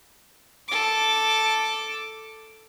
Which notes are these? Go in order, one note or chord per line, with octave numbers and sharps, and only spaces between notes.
A4 D6